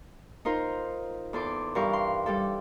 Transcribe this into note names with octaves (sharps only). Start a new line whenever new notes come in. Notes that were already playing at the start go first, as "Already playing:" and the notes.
D#4 F4 A#4 C5
E2 A4 C6 D6
G2 E3 G4 A#4 F5 C#6
C6
G3 G4 A4